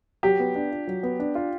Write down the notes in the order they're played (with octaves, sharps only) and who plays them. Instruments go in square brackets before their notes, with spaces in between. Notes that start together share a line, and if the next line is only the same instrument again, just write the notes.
[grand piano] F#3 [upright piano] G4
[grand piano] B3
D4
F4
F#3
B3
D4
F4